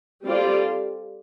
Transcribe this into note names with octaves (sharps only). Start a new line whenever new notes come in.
G3 C4 F4 A4 D5